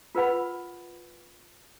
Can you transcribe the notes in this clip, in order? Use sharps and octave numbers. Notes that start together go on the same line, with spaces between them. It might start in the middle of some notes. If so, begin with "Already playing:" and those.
F4 A#4 B4 F#5 B5